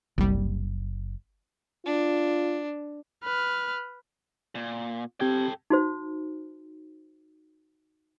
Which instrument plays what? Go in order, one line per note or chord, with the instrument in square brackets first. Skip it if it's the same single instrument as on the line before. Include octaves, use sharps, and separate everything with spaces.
[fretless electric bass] F#1 [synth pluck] C2 G3
[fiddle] D4 [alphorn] F4
[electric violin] B4 F6
[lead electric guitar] A#2
[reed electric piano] C4 G4 G#6 [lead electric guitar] A4 G5
[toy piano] D#4 F#4 C5